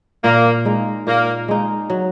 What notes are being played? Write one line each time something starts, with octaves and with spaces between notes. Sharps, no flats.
A#2 A#3
G#3 D#4
A#2 A#3
G#3 D#4
F#3